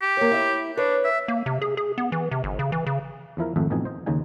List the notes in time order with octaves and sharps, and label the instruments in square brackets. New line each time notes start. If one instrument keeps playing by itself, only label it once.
[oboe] G4
[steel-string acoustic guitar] A#3 C#5
E4 E5
[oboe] D4 [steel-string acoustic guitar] B4 C#5
[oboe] E5
[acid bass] A#3
C3
G#4
G#4
B3
E3
C3
G1
C#3
E3
C#3
[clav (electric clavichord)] E2 F3 E4 A#4
G#1 F2 A3 G#4 E5 F#5
A1 F2 B2 D#4 G#5
C5 D#5
D#2 C#3 D#4 G#5